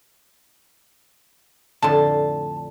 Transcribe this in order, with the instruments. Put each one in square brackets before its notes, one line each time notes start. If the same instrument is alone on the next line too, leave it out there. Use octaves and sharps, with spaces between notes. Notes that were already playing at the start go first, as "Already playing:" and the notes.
[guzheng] F2 A2 D3 [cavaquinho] A5 C6